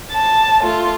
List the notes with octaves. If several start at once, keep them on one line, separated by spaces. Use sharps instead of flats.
A5
A3 F4